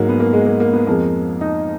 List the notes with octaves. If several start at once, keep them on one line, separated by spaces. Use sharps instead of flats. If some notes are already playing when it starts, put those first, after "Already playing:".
Already playing: G#2 F#3 A#3
B3
A#3
G#3
A#3
A#3
B3
F2 F3 G#3 A#3
D#4